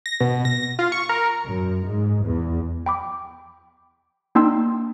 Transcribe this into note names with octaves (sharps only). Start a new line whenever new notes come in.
A#6
B2
A#6
F4
C#6
A#4
F#2
G#2
E2
G5 B5 D6
A#3 D4 D#4 G5 C6 E6